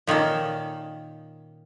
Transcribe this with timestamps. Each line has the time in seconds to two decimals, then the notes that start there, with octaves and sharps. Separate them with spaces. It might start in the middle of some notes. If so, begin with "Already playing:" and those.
0.07 A#2 D#3 C#4 A4